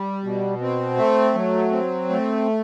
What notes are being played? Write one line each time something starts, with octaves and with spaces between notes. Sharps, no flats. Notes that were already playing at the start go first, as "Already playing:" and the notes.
Already playing: G3
B2
C4
A3
F#3
C4
A3